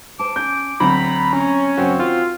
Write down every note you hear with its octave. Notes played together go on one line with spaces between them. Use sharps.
C5 A5 D6
C#4 G6
D2 F#3 C4 A#5 B5
C#4
F#2 C#3 F#3 C4 F#4
D#3 F4